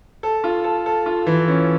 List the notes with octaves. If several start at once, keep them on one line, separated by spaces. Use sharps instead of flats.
A4
F4
A4
A4
F4
E3
C#4